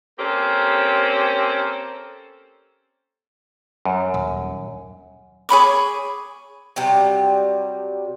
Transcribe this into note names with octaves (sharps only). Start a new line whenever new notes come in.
A#3 C4 C#4 G4 A4
F#2
D#1
G#4 C#5 B5 D6
C3 F#3 G3